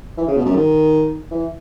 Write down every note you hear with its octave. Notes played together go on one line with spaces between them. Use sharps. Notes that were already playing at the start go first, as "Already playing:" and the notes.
E3
C#3
B2
F#2
D#3
E3